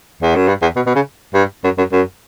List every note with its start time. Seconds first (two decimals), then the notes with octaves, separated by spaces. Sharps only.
0.22 E2
0.35 F#2
0.48 G2
0.62 E2
0.76 B2
0.86 B2
0.95 C#3
1.34 G2
1.64 F#2
1.78 F#2
1.92 F#2